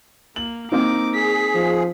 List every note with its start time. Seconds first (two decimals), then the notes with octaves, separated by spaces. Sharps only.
0.36 A#3 F#7
0.72 A#3 C4 D#4 D6
1.14 G#4 B6
1.55 F3